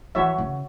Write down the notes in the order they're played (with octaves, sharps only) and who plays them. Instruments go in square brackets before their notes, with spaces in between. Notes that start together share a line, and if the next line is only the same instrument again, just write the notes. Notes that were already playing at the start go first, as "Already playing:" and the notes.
[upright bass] E3 [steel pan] F#4 C#5 E5
[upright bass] C#3